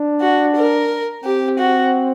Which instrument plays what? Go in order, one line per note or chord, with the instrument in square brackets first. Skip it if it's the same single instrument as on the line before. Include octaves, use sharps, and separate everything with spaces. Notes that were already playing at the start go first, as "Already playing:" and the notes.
Already playing: [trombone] D4
[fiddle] F#4
A#4
[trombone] C4 [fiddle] G4
[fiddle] F#4